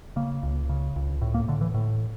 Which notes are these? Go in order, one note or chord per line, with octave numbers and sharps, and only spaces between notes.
C#3 A#3
C#2
C#3
C#2
A2
A#3
A2 D3
E3
A2